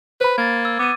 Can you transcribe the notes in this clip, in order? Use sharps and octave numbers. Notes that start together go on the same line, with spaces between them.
B4 C5 B5
A#3 G#6 A6
E6
B3 D6 D#7